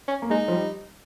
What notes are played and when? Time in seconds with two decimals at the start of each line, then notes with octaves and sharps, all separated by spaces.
0.08 C#4
0.22 A#3
0.30 G#3 D#4
0.48 F3
0.52 G3